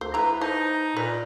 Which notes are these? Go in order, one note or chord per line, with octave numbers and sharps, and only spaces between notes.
D2 C5
E3 B4 A#5
D#4 C5 A5
A#2 B4